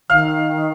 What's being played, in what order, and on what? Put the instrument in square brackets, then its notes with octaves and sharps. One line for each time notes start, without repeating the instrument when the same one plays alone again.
[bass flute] D#3 [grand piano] F5 F6